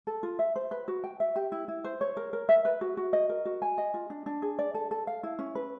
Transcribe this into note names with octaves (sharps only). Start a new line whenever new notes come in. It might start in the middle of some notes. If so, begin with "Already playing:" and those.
A4
F4
E5
C5
B4
F#4
G5
E5
G4
E4
E4
C5
C#5
A#4
A#4
E5
B4
F#4
F#4
D#5
A#4
F#4
G#5
D#5
F4
D4
D4
G#4
D5
A4
A4
F5
E4
C#4
B4